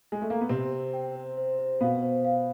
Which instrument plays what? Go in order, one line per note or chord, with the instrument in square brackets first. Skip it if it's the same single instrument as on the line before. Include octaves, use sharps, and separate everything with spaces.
[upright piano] G#3
A3
A#3
B3
[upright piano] C3 C4 [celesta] C5
[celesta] C5
G5
C5
C5
C5
[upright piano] B2 B3 [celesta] F5
[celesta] C5
F5